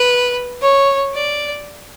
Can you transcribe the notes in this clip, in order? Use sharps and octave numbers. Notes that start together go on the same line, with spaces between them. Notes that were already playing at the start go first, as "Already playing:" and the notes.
Already playing: B4
C#5
D5